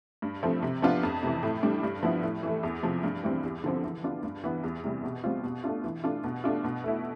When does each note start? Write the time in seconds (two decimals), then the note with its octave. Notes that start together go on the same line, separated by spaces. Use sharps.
0.22 G2
0.43 F3 A3 C4
0.63 C3
0.82 F3 B3 D4 F4
1.03 F2
1.23 C3 E3
1.43 A2
1.63 G3 D4
1.83 G2
2.03 F3 B3 E4
2.23 A2
2.43 E3 A3
2.63 E2
2.83 C3 F3
3.03 G2
3.24 E3 G3 C4
3.43 E2
3.64 D3 F3 C4
3.83 E3
4.03 B3 D4 F4
4.23 G2
4.44 E3 B3
4.63 E2
4.84 C3 G3
5.03 B2
5.24 G3 C4 F4
5.44 B2
5.64 A3 D4 F4
5.84 E3
6.04 A3 D4 F4
6.24 B2
6.44 A3 D4 F4
6.64 B2
6.84 A3 E4